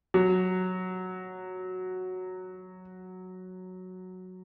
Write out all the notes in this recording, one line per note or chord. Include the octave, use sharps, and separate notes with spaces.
F#3